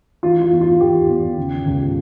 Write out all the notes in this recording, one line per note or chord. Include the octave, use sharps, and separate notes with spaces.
E3 F4
F4
E2
F4
E3 G4
E2
C#3
C#2